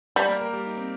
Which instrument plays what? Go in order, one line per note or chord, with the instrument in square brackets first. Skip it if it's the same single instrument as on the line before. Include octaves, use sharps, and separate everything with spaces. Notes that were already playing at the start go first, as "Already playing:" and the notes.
[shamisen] G3
[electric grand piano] A#3 A#4
A#3 A#4
G3 G4
D#4
C4